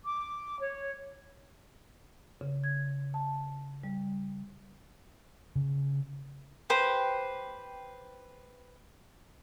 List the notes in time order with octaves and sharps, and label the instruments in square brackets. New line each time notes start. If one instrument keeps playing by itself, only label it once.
[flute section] D6
C#5
[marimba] C#3
G#6
A5
G3
[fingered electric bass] C#3
[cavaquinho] G4 B4 C5 G5